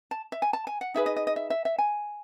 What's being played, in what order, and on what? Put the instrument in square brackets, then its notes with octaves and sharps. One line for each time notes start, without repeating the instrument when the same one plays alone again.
[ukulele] A5
E5
G#5
A5
G#5
F#5
D#4 G#4 B4 E5
D#5
D#5
D#5
E5
E5
E5
G#5